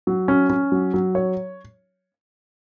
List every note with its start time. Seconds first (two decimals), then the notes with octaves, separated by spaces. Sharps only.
0.07 F#3
0.28 C#4
0.50 C#4
0.72 F#3
0.94 F#3
1.15 C#5